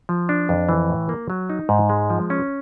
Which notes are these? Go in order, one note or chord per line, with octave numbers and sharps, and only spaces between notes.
F3
D4
F2
E3
A2
A#3
F#3
D#4
G#2
G#3
F3
C#4